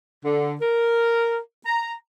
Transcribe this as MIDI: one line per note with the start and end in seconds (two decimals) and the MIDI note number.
0.24 0.54 50
0.61 1.38 70
1.66 1.94 82